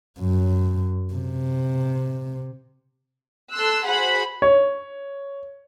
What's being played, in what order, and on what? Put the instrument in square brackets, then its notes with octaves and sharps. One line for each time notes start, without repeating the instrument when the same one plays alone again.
[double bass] F#2
C3
[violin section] A4 C6 E6 F#6
F#4 G#4 C5 F#5 B5
[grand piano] C#5